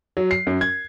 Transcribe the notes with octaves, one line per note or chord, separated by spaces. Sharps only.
F#3
C7
F#2
G#6